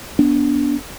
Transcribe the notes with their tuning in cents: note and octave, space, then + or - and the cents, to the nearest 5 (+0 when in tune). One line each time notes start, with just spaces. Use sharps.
B3 -10 D4 -20